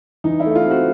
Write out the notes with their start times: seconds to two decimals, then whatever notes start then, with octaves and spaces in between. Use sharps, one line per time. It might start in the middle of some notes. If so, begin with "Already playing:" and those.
0.24 E3 D#4
0.40 E4
0.45 A3
0.55 F4
0.65 C4
0.71 F#4